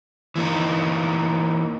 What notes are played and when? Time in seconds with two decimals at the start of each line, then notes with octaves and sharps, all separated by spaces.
0.36 E3 A#3 D#4